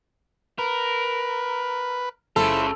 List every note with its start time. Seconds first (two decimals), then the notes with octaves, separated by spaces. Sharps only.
0.58 A#4 B4
2.36 F#1 C#3 E4 F4 A4 C5